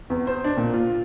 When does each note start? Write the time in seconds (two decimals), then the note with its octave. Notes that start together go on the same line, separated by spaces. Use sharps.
0.10 E2
0.27 C5
0.44 D4
0.57 A#2
0.74 F4